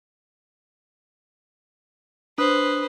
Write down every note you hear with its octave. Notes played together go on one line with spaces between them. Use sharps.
D4 B4 C5 D#6 F#6